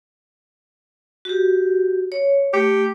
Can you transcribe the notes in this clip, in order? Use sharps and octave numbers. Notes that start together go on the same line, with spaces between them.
F#4 G4
C#5
A3 G4